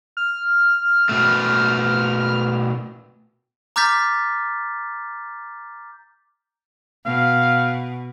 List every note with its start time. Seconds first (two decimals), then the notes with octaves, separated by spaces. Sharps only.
0.17 F6
1.09 B2 A3
3.76 A#5 D6 F6 G6 A6 B6
7.06 B2 F5